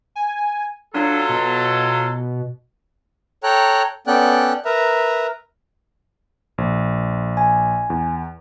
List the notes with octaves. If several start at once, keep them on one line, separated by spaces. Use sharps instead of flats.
G#5
F#3 D4 F4 A4
B2
A4 C#5 G5 A#5 F#6
B3 C#4 A4 D5 G5 F#6
A#4 B4 E5 A#5
A#1
G#5
E2